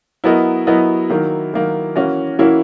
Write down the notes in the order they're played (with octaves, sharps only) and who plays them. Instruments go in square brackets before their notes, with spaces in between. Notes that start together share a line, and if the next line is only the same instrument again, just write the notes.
[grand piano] F#3 B3 F#4 A#4 D#5 [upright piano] E4
[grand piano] F#3 B3 F#4 A#4 D#5 [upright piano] E4
[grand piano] D#3 F#3 A#3
D#3 F#3 A#3
E3 A#3 C#4 F#4
[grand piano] E3 A#3 C#4 F#4 [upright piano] E4